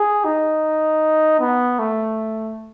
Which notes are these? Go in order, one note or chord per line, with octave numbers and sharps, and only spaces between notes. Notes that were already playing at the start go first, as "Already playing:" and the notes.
Already playing: G#4
D#4
B3
A3